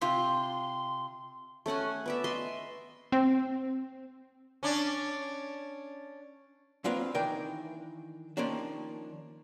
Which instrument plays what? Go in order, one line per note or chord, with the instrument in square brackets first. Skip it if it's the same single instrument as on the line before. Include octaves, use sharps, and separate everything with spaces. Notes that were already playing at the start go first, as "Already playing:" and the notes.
[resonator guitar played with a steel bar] C3 F4 [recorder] C6
[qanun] A3 C#4 F#5 G#5
B3 D5 E5
D#5 E5 C6
[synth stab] C4
[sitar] C#4 D4
[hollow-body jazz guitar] F#3 A#3 C4 D4 F4 B4
D#3 E3 D4 A#4 D5 G5
D#3 F3 A#3 C#4 D4